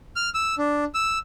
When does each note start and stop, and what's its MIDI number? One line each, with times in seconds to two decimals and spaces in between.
0.16 0.30 89
0.34 0.55 88
0.58 0.85 62
0.94 1.19 88